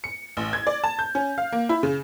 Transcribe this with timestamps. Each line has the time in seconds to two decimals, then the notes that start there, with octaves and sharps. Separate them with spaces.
0.04 C#7
0.37 A1
0.53 G#6
0.67 D5
0.84 A5
0.99 G6
1.15 C#4
1.38 F5
1.52 A#3
1.69 E4
1.83 C#3